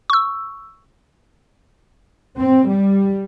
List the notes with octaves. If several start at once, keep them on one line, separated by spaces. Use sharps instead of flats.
C#6 E6
C4
G3